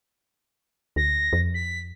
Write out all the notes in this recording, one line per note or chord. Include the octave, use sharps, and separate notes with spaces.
D2 A#6
F2
B6